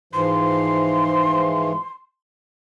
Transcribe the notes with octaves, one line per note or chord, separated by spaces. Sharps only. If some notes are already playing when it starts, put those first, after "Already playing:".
G#2 E3 F3 C6